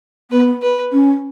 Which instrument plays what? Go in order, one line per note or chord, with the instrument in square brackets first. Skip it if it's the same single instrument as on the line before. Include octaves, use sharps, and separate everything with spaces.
[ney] B3 [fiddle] B4
[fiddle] B4
[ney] C#4